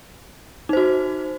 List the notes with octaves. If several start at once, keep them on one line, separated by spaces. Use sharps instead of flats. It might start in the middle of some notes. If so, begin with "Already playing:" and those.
D#4 F#4 C5